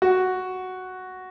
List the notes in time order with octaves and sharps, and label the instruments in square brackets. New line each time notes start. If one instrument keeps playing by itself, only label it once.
[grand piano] F#4